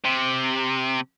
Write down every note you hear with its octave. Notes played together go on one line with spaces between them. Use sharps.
C3